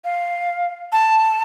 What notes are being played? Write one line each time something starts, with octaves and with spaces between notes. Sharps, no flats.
F5
A5